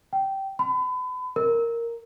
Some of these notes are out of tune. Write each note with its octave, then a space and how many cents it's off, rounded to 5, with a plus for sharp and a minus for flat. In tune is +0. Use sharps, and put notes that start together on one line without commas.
G5 -15
B5 +35
A#4 -5